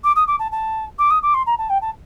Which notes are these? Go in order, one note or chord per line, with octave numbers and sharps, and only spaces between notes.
D6
D#6
D6
A5
A5
D6
D#6
D6
C6
A#5
A5
G5
A5